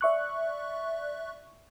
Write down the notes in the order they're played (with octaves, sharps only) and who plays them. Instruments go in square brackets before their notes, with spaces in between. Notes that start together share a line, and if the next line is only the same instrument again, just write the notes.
[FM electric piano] D5 E5 C#6 F#6